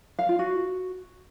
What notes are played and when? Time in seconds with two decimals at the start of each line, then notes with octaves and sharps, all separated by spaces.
0.19 F5
0.29 F4
0.39 F#4